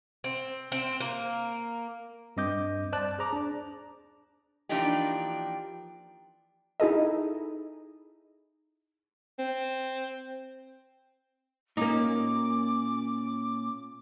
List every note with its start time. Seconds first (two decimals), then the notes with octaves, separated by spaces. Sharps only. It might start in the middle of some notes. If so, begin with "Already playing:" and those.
0.24 C4
0.72 C4
1.00 A#3
2.37 G2 C4 D#5 D6 G6
2.93 C5 D5 A5 F#6
3.19 G#4 C5 A#5 D6
3.33 D4
4.69 E3 F3 A#3 D4 D#4 G4
6.80 D#4 E4 G#4 A4 D#5
9.39 C4
11.77 A#2 A#3 C#4 D#4 D6